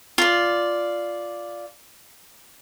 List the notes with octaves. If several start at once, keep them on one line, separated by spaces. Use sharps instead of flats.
F4 D5